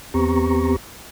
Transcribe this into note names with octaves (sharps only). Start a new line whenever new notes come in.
E2 B3 C4 G4 A#5 C#6